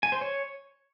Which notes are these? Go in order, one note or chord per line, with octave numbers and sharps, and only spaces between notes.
G#5
C5
C#5